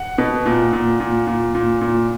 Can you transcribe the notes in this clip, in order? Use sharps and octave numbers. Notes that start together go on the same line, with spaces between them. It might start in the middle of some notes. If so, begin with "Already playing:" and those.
Already playing: F#5
B2
A#2
A#2
A#2
A#2
A#2
A#2